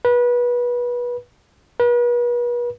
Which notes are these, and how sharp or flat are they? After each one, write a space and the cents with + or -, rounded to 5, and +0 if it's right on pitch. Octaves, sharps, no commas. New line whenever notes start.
B4 -25
B4 -40